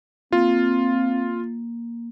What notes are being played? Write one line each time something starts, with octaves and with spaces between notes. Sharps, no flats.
A#3 C4 F4